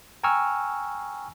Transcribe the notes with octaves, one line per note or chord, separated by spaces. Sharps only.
G5 G#5 A#5 C#6 E6 F6